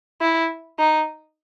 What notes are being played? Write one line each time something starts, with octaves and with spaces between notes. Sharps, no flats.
E4
D#4